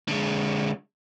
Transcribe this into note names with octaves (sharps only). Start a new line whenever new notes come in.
D3 G#3